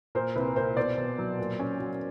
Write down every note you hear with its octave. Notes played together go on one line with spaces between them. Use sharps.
A#2 A#4 C5
C2 B4
A#2 A#4 C5
B2 C5 D5
B2
F#3
A#2
C#4
F#3